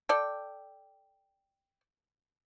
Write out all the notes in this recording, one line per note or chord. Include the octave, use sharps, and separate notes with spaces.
A4 D5 G5